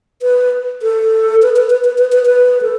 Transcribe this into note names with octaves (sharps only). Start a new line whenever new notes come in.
B4
A4
B4
B4
B4
B4
B4
B4
B4
A4